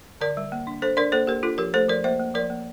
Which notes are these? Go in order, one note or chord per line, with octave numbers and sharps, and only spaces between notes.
D3 A#4 D5
G3
A#3
D4
D4 A4 C5
D4 A#4 D5
A#3 A4 C5
A#3 G4 A#4
D4 F4 A4
F3 G4 A#4
A3 A4 C5
F3 A#4 D5
A#3 C5 E5
A#3
F3 A#4 D5
A#3